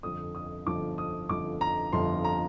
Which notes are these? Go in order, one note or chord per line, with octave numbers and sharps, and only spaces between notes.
G1 F2 D3 F3 D#6
D#6
G1 F2 D3 F3 D6
D#6
G1 F2 D3 F3 D6
A#5
G1 F2 D3 F3 C6
A#5